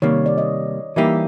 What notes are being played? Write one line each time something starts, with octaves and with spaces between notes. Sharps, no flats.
C3 D#3 G3 A#3 C#5
D5
D#5
E3 G3 A#3 D#4 G4 E5